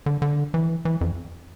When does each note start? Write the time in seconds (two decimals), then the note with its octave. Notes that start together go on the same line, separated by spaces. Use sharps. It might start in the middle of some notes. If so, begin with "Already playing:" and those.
0.06 D3
0.22 D3
0.54 E3
0.85 E3
1.01 F2